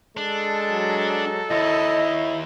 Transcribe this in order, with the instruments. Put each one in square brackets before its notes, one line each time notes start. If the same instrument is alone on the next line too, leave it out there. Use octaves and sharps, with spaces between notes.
[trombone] G#3 [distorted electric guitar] D4 [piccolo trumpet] A4
[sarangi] F#3
[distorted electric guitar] D#2 [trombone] E4 [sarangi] D#5